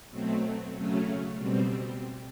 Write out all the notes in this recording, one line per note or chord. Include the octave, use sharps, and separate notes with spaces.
B2 F#3 A3 C4
C#3 F#3 A3 C#4
B2 G3 C4